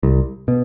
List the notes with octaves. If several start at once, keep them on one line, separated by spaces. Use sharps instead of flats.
C2
B2